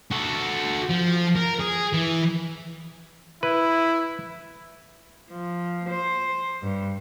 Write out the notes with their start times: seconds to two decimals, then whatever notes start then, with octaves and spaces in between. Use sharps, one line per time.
0.12 F#4 A4
0.89 F3
1.35 A#4
1.59 G#4
1.93 E3
3.43 E4 B4
5.31 F3
5.89 C5
6.62 G2